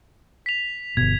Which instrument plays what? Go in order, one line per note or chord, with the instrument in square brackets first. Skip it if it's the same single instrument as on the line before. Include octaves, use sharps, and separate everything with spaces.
[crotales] B6 F7
[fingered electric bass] G1 B2 [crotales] G#6